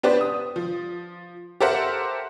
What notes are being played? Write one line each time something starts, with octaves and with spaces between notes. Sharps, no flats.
B3 D4 G4 B4 C5 D5
D#6
F3
G4 A4 A#4 C5 E5 F#5